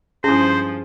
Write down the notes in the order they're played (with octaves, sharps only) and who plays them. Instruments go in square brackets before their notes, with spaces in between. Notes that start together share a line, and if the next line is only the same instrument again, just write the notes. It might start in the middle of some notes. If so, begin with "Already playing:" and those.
[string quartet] G2 F3 [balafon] C#4 E4 [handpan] G#4 [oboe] C5